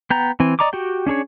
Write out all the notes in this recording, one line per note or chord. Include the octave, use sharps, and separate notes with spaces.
B3 G5 A#5
E3 C4 G#5
D5 D#5 A#5 C#6 D6
F#4 G4 G5
C#4 D4 G#4 C#5